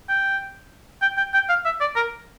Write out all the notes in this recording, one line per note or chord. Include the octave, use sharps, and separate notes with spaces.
G5
G5
G5
G5
F5
E5
D5
A#4